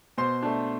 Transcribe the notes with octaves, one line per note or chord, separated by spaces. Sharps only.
B2 C5 C6
A3 D4